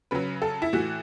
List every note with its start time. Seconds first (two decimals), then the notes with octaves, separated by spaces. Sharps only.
0.11 C#3 F#3 B4
0.42 A4
0.62 E4
0.73 A2 E3 F#4